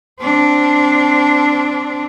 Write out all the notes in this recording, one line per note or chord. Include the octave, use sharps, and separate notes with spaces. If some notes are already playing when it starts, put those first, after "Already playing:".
C4 D4